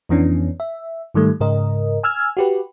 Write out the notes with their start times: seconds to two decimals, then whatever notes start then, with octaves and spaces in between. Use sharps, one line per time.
0.09 F2 E3 B3 C#4 D4
0.60 E5
1.14 G#2 D#3 G3 A3
1.40 G#2 C#3 A#4 D#5
2.03 G#5 E6 F6 G#6
2.37 F#4 G4 B4